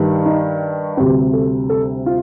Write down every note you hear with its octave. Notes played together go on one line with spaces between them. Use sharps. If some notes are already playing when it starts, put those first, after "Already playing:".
Already playing: G2 D#3 G3
D#4
D2 C3 G3 C4 G4
A4
A4
F4